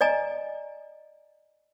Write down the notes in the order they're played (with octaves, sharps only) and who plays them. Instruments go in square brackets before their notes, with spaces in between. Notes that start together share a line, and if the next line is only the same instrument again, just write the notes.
[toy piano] D5 D#5 G#5 A#5